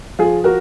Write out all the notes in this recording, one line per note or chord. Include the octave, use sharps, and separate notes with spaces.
F3 F4 G#4
F#4 A#4